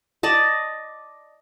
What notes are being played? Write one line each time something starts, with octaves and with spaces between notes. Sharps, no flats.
D5 D#5 A5